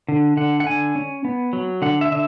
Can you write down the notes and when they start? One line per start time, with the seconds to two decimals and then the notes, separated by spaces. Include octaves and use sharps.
0.08 D3
0.37 D3 F#5
0.60 F#5
0.66 D3 G#5
0.95 C#4
1.25 B3
1.53 F#3
1.82 D3 F#5
2.01 E5
2.11 D3 E5